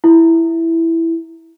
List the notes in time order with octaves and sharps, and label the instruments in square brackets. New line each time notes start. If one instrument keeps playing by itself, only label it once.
[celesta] E4